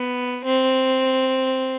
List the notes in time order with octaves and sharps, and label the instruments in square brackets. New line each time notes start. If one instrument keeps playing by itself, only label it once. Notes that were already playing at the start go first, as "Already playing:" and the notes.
Already playing: [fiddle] B3
C4